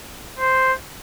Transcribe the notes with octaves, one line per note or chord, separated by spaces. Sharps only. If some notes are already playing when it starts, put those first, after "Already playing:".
C5